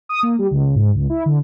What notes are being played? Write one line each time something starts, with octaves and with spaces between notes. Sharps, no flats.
D#6
A#3
G3
C#2
G#2
C#2
E4
D3